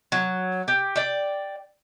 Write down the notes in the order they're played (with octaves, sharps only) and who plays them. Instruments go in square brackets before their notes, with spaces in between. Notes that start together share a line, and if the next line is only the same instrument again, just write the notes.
[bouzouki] F#3
G4
D5 G5